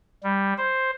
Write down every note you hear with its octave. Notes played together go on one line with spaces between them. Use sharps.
G3
C5